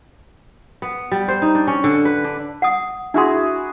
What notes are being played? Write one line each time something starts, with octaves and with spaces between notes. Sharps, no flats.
B3
G3
C5
D#4
D4
C#4
D3
B4
D4
F#5 D#6
D4 E4 F#4 G#4 C6